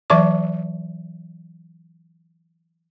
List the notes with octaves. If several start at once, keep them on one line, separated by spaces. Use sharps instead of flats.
E3 F#3 D5 E5 A5 D6